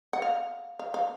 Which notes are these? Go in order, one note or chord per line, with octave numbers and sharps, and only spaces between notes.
F#5
F5
F5
F5